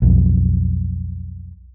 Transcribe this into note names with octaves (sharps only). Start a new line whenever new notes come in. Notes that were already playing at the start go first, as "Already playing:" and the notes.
B1 F2